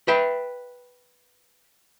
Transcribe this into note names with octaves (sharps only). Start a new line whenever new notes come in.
B4 E5 G5